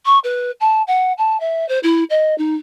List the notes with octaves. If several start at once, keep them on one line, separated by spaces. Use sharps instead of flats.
C#6
B4
A5
F#5
A5
E5
C5
E4
D#5
D#4